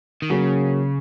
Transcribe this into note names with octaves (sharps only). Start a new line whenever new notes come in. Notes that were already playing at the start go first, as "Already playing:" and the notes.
D#3
C#3 F#3 A#3 C#4 G#4